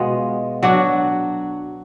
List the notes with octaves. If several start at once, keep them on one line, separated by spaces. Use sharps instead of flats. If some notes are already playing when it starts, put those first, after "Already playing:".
Already playing: B2 G#3 B3 F4
F#3 D4 F#4